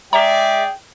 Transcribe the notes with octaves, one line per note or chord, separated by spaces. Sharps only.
G#3 G#4 D5 E5 G5 A#5